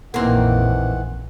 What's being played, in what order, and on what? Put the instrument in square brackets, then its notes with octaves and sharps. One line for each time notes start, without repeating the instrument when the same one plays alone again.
[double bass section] A#1 F2 [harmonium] D#3 E3 F#5 [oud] A#3 C4